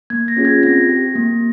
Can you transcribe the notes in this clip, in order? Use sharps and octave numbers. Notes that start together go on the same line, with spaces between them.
A#3 G#6
A#6
C#4 F4 G#4
G#6
C4 A#6
G4
A#3